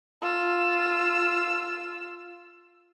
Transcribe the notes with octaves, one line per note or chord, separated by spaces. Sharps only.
F4 E6